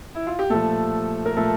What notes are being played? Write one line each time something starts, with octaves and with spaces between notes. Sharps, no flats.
E4
F4
G4
A#2 F3 A3 A4
A#4
A#2 F3 A3 A4